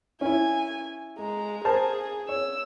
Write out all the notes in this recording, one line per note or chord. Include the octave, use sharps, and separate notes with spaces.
C#4 E4 G#5
G#3 A#5
G#4 A#4 C5 A5
C#5 E6